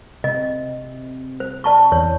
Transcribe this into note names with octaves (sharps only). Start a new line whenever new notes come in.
C3 D#5
C5
D5 A5 C#6
E2 C#5